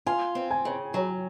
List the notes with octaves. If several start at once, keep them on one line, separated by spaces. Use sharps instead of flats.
F4 G#5
C4
G#5
C#3
F#3 C#5